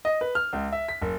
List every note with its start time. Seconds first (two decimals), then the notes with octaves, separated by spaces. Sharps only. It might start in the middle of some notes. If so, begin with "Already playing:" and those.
0.05 D#5
0.21 B4
0.35 F6
0.53 C#2
0.72 E5
0.88 B6
1.02 F#1